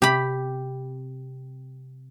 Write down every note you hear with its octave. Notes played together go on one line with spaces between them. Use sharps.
C3 G4 B5